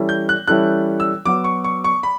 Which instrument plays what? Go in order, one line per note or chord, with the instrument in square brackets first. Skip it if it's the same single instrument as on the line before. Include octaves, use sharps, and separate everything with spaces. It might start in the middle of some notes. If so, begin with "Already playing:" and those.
Already playing: [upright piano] E3 G3 C#4 E4 A4
[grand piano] G6
F#6
[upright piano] E3 G3 C#4 E4 A4 [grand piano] F#6
[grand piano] E6
[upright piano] F#3 B3 F#4 [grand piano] D6
[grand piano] C#6
C#6
C#6
B5